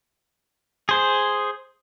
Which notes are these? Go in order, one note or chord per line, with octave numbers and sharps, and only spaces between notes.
G#4 C5